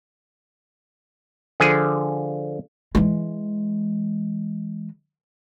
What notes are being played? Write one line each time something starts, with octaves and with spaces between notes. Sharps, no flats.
D3 F3 G#4 G#5
E3 G#3